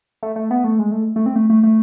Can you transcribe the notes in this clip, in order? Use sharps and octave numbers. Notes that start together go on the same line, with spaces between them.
A3
A3
B3
A3
G#3
A3
A3
C4
A3
A3
A3